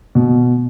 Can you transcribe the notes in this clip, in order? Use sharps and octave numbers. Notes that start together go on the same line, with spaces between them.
B2